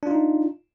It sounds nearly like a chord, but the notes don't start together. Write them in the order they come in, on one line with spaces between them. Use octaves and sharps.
D4 F4 D#4